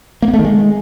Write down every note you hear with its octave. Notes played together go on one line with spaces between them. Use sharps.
A#3
B3
A3
D#3
G#3